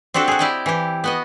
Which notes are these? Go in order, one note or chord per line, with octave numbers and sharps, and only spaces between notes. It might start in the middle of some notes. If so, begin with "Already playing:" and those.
C4 D4 F#4 G4 A4
F#4 G#4
E4 G4 D5 D#5 G5
E3 G4
B3 F#4 D#5